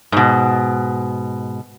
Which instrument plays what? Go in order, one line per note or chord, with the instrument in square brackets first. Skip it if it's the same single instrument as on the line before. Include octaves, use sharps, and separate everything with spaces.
[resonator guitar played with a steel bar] G#2 B2